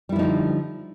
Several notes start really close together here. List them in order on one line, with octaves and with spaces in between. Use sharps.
G3 E4 F3 D#4 D3